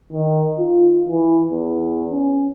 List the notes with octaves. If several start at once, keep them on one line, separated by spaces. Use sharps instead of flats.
D#3
F4
E3
E2
C#4